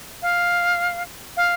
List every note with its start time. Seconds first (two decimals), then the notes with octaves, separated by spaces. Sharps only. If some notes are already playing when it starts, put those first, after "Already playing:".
0.22 F5
1.37 F5